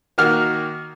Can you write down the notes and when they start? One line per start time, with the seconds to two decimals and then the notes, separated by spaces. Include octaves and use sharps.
0.18 D#3 A#3 F#4 F6